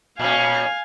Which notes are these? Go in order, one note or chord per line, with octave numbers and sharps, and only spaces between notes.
A#2 C#4 F5 G#5